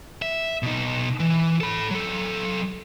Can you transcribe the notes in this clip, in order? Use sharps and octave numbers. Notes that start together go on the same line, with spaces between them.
E5
B2 D#4
E3
A4 B5
F#3 A4